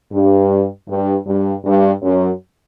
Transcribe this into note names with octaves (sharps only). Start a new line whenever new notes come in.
G2
G2
G2
G2
F#2